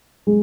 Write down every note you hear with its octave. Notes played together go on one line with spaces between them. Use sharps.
G#3